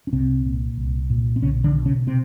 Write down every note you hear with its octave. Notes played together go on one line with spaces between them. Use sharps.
C#4
C2 C3 C4
A#2
C2
A#2
C4
B1 C#3 C#4
D3 D4
B2
C#3 C#4
C3 C4